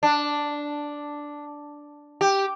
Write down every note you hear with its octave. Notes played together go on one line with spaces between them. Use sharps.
D4
G4